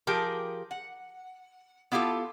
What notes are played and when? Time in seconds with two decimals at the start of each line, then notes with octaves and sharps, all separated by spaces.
0.07 F3 G4 G#4 A#4
0.71 F#5
1.92 B3 E4 F4 G4 A4